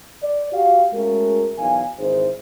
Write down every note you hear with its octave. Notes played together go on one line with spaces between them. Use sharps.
D5
F#4 G4 F5
G#3 A3 C#4 F#4 G#4 A#4
E2 B2 F#3 D#4 F5 G#5
G#1 E3 D#4 G#4 C5